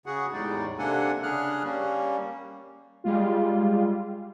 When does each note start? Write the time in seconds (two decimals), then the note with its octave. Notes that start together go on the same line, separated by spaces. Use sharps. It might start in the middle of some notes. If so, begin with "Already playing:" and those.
0.06 C#3 F#4 G#4 F#5
0.33 E2 A2 G3 G#3 D#4 D5
0.78 C3 A#3 D4 A4 F#5 G#5
1.23 C#3 D4 G#4 F6 F#6
1.63 G3 A#3 C#4
3.04 G3 G#3 F4